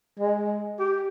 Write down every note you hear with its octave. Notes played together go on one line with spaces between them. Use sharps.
G#3
G4